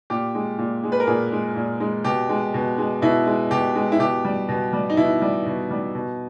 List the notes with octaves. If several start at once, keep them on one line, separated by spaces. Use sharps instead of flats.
A#2 G4
G#3
A#2
G#3
B4
A#4
A#2 G#4
G#3
A#2
G#3
B2 G4
G#3
B2
G#3
B2 E4
G#3
B2 G4
G#3
E4
B2 G4
G3
B2
G3
D#4
B2 E4
G3
B2
G3
B2